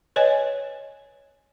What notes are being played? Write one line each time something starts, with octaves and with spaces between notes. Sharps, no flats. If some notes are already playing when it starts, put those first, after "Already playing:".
B4 C#5 D#5 G#5